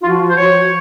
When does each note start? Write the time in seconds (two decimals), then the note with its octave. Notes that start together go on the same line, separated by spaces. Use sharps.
0.02 F4
0.07 F3 F#4
0.28 C5
0.37 F3 C#5